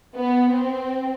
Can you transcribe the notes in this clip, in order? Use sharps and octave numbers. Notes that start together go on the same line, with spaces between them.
B3
C4